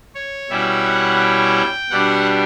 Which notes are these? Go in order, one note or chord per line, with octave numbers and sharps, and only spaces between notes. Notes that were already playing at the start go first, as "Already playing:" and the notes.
C#5
B2 G3 C#4 E4 E5
F#5
G5
B2 G3 D4 F#5